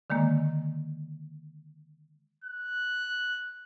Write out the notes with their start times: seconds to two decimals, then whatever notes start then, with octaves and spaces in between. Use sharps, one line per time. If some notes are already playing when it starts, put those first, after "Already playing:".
0.10 D3 D#3 G#3 A#3
2.44 F#6